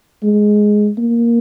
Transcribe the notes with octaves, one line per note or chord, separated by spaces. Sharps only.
G#3
A#3